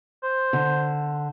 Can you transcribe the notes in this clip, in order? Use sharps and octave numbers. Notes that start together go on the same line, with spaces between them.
C5
D3